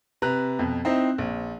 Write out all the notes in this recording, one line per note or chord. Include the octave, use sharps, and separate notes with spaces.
C3 B4 A#5 F#6
F2 B2
C4 D#4 E4 C5
A#1